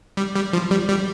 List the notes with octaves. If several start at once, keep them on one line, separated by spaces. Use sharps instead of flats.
G3
G3
F3
G3
G3